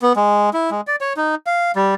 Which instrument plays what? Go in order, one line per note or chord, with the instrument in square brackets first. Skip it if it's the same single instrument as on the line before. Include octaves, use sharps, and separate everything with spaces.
[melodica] B3
G#3
E4
G#3
D5
C#5
D#4
F5
G3